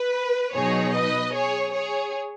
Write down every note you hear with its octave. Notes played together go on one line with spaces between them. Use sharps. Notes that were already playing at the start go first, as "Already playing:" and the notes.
Already playing: B4
B2 F#3 D#4 G#4 C#5
B4 D#5
G#4 C#5
G#4 C#5